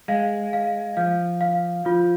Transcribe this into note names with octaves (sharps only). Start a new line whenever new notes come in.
G#3 F5
F5
F3 F5
F5
F3 F4